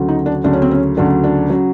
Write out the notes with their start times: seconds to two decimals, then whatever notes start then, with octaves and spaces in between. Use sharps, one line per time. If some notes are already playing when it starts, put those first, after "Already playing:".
Already playing: D2 C#3 F#3
0.08 D#4
0.26 D4
0.44 D2 C#3 F#3 D4
0.53 C#4
0.62 C4
0.71 C#4
0.97 D2 C#3 F#3 D4
1.24 D4
1.50 C#3 F#3